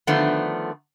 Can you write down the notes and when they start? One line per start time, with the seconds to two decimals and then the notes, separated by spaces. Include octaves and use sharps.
0.07 D3 D#3 F3 A3 B3